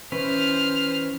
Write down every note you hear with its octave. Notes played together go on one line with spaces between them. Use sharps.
E3 C#4 B4 C5 F6